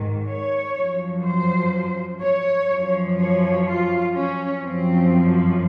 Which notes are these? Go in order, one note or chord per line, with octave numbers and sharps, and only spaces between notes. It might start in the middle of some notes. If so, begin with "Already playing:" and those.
Already playing: G#2 D#3
C#5
F#2 F3
C5
C#5
F#2 F3
C#5
F4
C#4
F#2 F3 C4